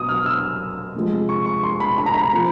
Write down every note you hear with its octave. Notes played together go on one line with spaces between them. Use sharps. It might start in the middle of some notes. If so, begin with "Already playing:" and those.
Already playing: B2 F#3 B3 D#6
F6
E6
C3 F3 G#3
C#6
C#6
C6
B5
B5
A#5
B5
A2 F3 A3 C4